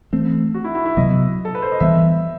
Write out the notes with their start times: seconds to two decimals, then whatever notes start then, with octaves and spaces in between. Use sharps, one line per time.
0.13 E3 A3 C4
0.54 F#4
0.64 E4
0.75 E4
0.85 E4
0.97 C3 F#3 B3 D#5
1.45 A4
1.55 B4
1.62 C5
1.72 D#5
1.80 E3 G3 B3 E5